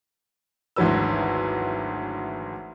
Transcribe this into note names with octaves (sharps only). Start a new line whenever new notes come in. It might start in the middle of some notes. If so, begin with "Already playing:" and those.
G#1 D2 E3 F#3 B4 E6